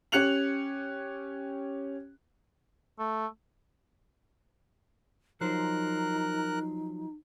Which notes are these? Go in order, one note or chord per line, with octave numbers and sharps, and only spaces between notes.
C#4 G4 F#6 C#7 F7 F#7
A3
F3 F#3 D#4 A#4 C5 F#6